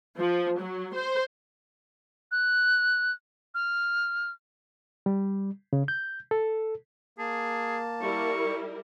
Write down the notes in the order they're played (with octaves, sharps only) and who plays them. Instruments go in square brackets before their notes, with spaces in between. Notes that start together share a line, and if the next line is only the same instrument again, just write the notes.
[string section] F3
F#3
C5
[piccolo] F#6
F6
[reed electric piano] G3
C#3
G6
A4
[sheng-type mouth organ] A#3 A5 [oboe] G#4
[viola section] G3 E4 A#4 [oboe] C#6